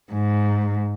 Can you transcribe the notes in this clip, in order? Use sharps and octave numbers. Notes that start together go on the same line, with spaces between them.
G#2